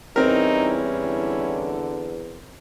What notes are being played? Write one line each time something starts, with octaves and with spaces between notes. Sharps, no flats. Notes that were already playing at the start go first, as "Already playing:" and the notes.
E2 G3 C4 C#4 D#4 E4 A#4
D3